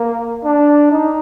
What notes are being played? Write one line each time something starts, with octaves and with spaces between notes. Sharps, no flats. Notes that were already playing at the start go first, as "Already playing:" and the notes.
Already playing: A#3
D4
D#4